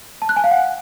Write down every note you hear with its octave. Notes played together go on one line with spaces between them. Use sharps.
A5
F#6
G#5
F5
F#5